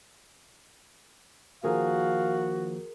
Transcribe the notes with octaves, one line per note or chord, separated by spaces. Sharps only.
D#3 F3 A#3 F#4 G#4 A#4 F5